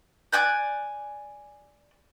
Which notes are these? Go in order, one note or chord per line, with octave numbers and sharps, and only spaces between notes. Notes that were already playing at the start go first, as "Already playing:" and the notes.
D5 G#5 F#6 G6